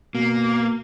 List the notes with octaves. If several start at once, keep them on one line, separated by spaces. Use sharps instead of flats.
B2 A#3